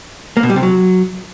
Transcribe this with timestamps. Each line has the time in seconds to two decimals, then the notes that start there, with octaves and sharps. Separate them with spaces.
0.37 A#3
0.43 B2
0.50 G3
0.56 C3
0.63 F#3